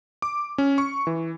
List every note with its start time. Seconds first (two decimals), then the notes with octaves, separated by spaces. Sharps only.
0.22 D6
0.58 C#4
0.78 C#6
1.07 E3